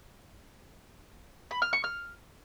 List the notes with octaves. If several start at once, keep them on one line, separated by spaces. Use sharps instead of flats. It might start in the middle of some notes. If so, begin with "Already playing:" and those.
B5
F6
C#6
F6